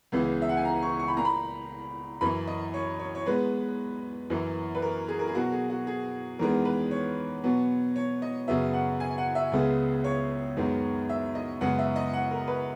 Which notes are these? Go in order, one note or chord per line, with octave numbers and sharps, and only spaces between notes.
C#2 C#3 E3 B3
E5
F#5
G#5
A#5
C#6
C#6
B5
A#2 A#3 A#5
B5
F#2 E3 A#3 B5
D#5
C#5
C#5
C#5
A#2 G#3 B3 B4
F#2 E3 A#3
B4
A#4
G#4
A#4
G#4
B2 F#3 A#3 F#4
G#4
F#4
G#4
E2 D#3 G#3 B3 A#4
B4
C#5
B2 F#3 B3
C#5
D#5
F#2 C#3 F#3 B3 E5
F#5
G#5
F#5
E5
C#2 C#3 G#3 B3
C#5
F#2 D#3 G#3 B3
E5
D#5
F#2 C#3 G#3 B3 F#5
E5
D#5
F#5
A#4
B4